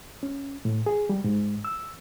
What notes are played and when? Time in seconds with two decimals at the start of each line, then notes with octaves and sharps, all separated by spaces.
0.23 C#4
0.65 A2
0.86 G#4
1.09 G3
1.24 G#2
1.65 E6